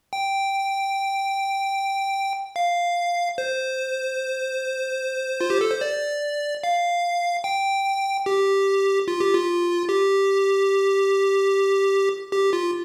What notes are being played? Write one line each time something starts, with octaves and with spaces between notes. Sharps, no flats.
G5
F5
C5
F4
G4
A4
C5
D5
F5
G5
G4
F4
G4
F4
G4
G4
F4